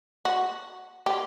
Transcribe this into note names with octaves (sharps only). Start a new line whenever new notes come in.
F#4
G4